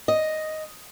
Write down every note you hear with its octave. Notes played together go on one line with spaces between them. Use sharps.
D#5